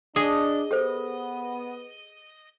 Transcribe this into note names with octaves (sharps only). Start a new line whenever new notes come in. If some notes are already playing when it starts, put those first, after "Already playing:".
D4 G#4 D#5
B3 G4 A4 C5